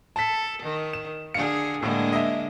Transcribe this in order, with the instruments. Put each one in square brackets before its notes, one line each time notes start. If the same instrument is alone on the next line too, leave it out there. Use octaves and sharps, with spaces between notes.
[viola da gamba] A4 [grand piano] A5 B6
[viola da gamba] D#3
[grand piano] E7
[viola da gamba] D3 G#4 [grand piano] F5 C#7
[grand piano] A2 [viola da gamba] D3 G#3 A#3
[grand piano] D#5 E5